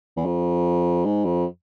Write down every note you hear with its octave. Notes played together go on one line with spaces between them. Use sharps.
E2
F2
G#2
F2